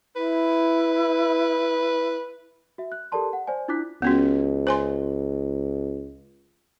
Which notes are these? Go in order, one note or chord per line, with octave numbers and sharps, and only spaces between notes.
E4 B4
F#4 E5
F#6
G4 A4 A#4 D5 A5 C6
F#5
C5 D5 G#5
D4 E4 F4 D6 F#6 B6
C#2 B3 C#4 F#4
C5 G#5 C6